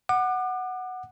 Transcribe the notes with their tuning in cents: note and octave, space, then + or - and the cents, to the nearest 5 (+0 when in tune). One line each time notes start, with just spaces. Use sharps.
F#5 +0 D6 +40